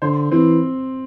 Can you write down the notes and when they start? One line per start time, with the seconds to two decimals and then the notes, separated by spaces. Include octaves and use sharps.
0.02 D3 C5
0.31 E3 C4